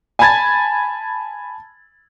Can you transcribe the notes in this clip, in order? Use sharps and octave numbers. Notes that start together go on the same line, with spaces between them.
G#5 A5 B5 G#6 A6